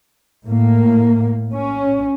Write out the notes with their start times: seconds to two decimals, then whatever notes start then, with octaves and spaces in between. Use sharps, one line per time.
0.45 A2 A#3
1.53 C#4